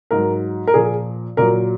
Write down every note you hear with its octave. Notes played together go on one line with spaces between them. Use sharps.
G#2 F#3 A#4
A#4
A#2 F3 G#4
A#2 F#3 A#4